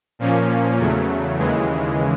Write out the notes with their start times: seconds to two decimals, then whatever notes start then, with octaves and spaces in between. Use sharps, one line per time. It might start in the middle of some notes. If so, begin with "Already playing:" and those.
0.19 A#2 F3 A#3 C#4
0.79 E2 C#3 F#3 A3
1.38 D#2 C#3 E3 G#3